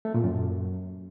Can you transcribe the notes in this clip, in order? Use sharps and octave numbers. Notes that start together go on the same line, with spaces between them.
A3
A#2
F#2